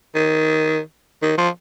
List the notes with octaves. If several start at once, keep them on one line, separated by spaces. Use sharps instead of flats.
D#3
D#3
F3